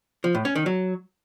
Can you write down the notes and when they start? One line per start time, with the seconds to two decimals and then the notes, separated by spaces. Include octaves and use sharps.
0.24 F3
0.34 A2
0.45 C#4
0.55 D#3
0.66 F#3